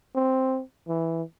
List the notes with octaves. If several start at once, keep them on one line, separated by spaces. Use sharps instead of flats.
C4
E3